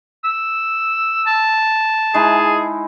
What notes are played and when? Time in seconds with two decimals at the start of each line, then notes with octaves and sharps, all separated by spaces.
0.24 E6
1.27 A5
2.14 G#3 D#4 E4 G#4